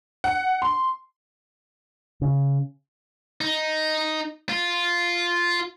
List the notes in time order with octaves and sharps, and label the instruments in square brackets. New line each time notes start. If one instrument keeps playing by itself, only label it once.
[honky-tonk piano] F#5
C6
[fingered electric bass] C#3
[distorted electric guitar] D#4
F4